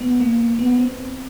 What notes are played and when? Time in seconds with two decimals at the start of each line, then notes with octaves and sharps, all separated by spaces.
0.01 B3
0.20 A#3
0.40 A#3
0.59 B3
0.78 C4